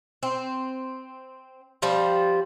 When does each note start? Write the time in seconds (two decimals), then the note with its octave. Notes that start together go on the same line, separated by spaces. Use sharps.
0.23 C4
1.82 F3 G3 C4